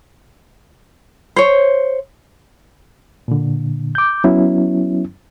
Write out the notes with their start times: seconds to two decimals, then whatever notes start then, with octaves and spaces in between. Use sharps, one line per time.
1.36 C5 C#5
3.28 A#2 D3
3.95 D6 G6
4.24 F#3 B3 C#4 E4